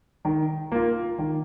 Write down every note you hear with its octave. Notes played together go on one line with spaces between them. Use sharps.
D#3
A#3 F4
D#3